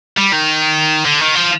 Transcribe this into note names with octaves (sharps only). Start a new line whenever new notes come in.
G3
D#3
D3
D#3
F3